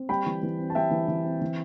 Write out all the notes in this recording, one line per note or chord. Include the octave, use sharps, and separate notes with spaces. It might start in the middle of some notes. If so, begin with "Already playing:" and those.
Already playing: C4
G3 G5 B5
E3
E3
C4
A5
G3 E5 G5
E3
E3
C4
E3